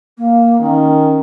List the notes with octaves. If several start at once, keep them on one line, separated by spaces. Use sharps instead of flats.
A#3
D#3 C#4